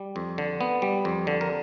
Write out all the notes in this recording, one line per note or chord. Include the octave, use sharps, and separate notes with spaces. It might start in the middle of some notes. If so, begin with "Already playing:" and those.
Already playing: G3
F2
D3
B3
G3
F2
D3
A#4